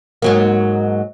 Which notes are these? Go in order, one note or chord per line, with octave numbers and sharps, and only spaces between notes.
G#2 F#3 A#3